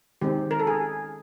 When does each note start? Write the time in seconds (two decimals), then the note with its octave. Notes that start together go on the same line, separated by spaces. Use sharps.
0.21 D#3 G#3 C4 G4
0.51 A#4
0.60 A4
0.67 G#4